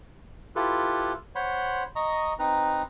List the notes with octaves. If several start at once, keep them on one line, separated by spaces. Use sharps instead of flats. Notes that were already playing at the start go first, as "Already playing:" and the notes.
E4 F4 G4 A4 B4
C5 C#5 F#5 B5 C6
D#5 A#5 C#6 D#6
C4 D#4 B4 A#5